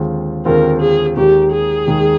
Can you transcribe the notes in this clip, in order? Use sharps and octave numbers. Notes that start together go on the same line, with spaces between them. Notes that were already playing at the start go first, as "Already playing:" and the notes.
Already playing: D#2 D3 G#3 C4 F4
D#2 D3 G#3 C4 F4 A#4
G#4
D#2 D#3 G#3 G4
G#4
D#2 D#3 G#3